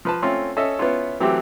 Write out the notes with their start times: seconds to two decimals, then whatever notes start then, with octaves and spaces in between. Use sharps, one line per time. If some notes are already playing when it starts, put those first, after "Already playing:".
0.05 F3 B4 A5
0.22 A3 C4 C#4 F4
0.57 C#4 A4 D#5 E5
0.79 B3 C#4 E4 F4
1.20 E3 F#3 A3 C4 G4